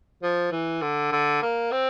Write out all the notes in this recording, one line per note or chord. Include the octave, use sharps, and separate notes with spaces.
F3
E3
D3
D3
A#3
C4